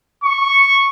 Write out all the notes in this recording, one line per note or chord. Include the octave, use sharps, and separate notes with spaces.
C#6